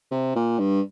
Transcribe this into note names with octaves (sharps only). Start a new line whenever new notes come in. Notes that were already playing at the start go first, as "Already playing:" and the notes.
C3
A#2
G2